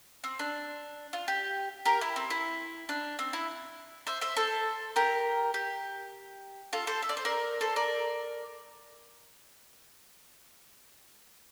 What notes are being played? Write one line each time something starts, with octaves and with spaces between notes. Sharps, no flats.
C4
D4
F4
G4
G4 A#4
E4
C4
E4
D4
C4
E4
C5 E5
C5 E5
A4 C5
G4 A#4
G4
F4 A4
A4 C5
E5
D5
C5
A#4 D5
A4 C5
A#4 D5